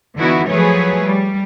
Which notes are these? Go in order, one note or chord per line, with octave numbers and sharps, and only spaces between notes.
D3 E3 B3 D#4 E4 F#4
F3 F#3 A3 G#4 B4 C#5
G3